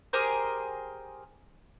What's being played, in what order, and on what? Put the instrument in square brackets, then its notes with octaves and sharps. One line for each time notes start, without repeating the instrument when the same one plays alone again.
[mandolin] G4 G#4 A#4 C5